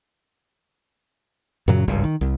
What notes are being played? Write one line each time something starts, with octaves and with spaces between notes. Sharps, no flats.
F#2 A#2 C#3 F#3
G#1 C#2 G2
D#3
C2